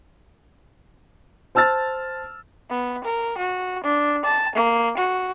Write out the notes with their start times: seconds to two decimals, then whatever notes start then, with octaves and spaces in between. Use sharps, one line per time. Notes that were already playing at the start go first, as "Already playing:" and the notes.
1.55 C5 A5 E6 F6 A6
2.70 B3
3.04 A#4
3.38 F#4
3.83 D4
4.25 A5
4.55 A#3
4.97 F#4